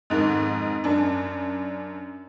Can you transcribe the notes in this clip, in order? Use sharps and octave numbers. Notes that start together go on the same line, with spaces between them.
F2 G#2 D#3
F#2 D4